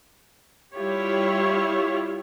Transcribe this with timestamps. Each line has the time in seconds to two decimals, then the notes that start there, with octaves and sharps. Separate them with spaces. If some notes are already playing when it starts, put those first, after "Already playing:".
0.74 G3 E4 F4 G4 C#5